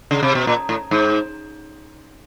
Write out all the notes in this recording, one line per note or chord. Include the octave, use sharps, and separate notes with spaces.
C#3
C3
B2
A#2
A2
G#2